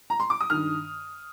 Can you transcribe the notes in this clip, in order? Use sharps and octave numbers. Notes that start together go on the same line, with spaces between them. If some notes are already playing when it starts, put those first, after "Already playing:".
A#5
C6
D6
D#6
G2 D#3 F6